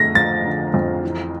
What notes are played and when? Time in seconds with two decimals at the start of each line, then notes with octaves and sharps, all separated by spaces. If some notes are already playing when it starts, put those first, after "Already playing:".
Already playing: F2 D3 A3 A#6
0.15 F3 A6
0.44 D3
0.74 F2
1.03 E3